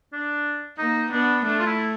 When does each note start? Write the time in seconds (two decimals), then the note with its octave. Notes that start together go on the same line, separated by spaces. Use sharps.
0.13 D4
0.78 A#3 D#4
1.11 B3 D4
1.45 A3 D4
1.59 F4
1.66 E4